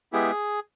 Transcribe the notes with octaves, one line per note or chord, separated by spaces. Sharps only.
G#3 B3 E4 G4 G#4